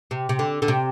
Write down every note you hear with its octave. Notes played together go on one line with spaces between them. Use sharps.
C3
C3
D3
D3
C3